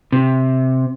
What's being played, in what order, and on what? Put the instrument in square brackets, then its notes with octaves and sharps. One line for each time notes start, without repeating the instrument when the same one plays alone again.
[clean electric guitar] C3